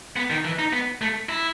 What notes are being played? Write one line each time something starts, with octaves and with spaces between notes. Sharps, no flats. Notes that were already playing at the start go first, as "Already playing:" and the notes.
B3
D#3
E3
D#4
B3
A3
E4